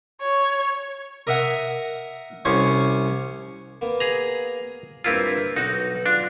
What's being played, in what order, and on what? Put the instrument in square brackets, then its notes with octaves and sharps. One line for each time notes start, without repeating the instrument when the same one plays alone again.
[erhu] C#5
[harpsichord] A#4 D#5 E5 F#5
C2 C#4 C5 C#5 C#6
A#3 B3
[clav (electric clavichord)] G#4 A#5
[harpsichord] G2 A#3 A#5 [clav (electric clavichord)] C4 E4 F4
[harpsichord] B1 [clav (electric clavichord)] D#4 F#4
[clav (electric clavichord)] D4 [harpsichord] F4